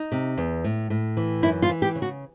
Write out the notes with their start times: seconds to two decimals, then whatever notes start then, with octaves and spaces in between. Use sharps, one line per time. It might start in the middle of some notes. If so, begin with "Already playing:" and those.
Already playing: D#4
0.12 C3
0.37 E2
0.64 A2
0.90 A2
1.17 E3
1.42 F#2 E4
1.62 F4
1.69 E3
1.82 G4
1.95 C#3
2.02 F#4